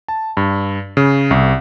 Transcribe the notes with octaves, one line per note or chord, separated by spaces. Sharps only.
A5
G2
C#3
C2